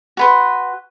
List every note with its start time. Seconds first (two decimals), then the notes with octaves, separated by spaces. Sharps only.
0.17 F#4 B4 C6